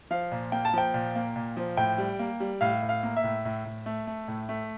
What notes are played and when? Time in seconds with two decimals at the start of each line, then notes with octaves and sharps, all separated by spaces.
0.11 F3 F5
0.32 A#2
0.52 A#3 G5
0.65 A5
0.74 F3 G5
0.94 A#2
1.15 A#3
1.36 A#2
1.57 F3
1.77 A2 G5
1.98 G3
2.19 A#3
2.40 G3
2.61 A2 F5
2.82 A2
2.89 F5
3.03 A#3
3.17 E5
3.23 A2
3.45 A2
3.65 A2
3.86 A3
4.07 A3
4.28 A2
4.49 A3